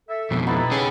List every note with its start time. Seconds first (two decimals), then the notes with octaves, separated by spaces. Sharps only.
0.09 A4 E5
0.31 F2 B2
0.47 B3 D#4 E4 G4 A4 B4
0.71 C#4 G#4